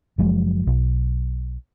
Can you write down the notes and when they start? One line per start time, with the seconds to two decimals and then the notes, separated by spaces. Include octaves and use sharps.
0.18 F#1 F3 F#3 G#3
0.67 B1